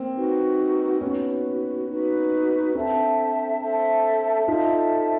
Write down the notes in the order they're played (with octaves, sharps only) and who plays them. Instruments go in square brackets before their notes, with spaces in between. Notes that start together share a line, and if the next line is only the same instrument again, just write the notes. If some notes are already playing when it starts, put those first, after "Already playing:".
Already playing: [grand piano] A#3 C4
[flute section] D#4 F#4 B4
[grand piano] B3 C#4 [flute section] D#4 F#4 B4
[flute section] D#4 F#4 B4
[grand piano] C4 D4 [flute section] A4 C5 E5 A5
[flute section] A4 C5 E5 A5
[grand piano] D#4 F4 [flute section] A4 C5 E5 A5